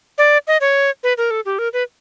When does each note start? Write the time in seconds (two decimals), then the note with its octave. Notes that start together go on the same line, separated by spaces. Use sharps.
0.18 D5
0.47 D#5
0.61 C#5
1.03 B4
1.18 A#4
1.31 A4
1.45 G4
1.59 A#4
1.73 B4